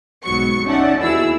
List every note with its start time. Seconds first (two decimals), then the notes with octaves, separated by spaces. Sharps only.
0.24 B1 G#2 F#3 B3 C#6 C#7
0.65 C#4 D#4 D5 E5 F#5 A5
0.98 D#2 B2 E4 G#4 E6